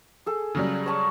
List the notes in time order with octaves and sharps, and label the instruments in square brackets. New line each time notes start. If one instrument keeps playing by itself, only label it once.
[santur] G#4 A4
[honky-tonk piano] C#3 F#3 G3
[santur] C#5 A5 C#6